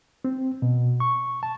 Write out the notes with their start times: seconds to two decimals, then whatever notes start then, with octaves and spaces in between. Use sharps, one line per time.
0.25 C4
0.62 B2
1.00 C#6
1.43 A5